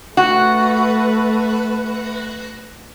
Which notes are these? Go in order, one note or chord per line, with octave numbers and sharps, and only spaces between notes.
A3 F#4 B4